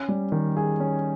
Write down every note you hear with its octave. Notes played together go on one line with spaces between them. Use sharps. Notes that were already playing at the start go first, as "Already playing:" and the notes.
Already playing: C#4
G3
D#3
G#4
C#4